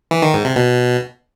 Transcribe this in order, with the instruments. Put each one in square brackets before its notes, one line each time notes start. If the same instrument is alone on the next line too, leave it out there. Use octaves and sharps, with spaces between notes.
[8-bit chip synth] E3
D#3
G#2
C3
B2